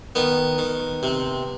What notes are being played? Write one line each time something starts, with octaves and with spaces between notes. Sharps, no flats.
D#3 B3
D#3
C3